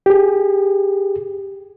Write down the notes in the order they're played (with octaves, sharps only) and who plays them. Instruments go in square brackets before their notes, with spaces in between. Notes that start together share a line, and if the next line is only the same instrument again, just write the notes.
[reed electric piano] G4 G#4